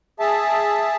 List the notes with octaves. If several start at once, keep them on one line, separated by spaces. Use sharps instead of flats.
G#4 E5 A5